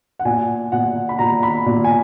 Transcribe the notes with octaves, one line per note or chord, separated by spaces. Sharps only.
F#5
A#2 G#5
A#2 F#5
B5
A#2 A#5
B5
A#2
G#5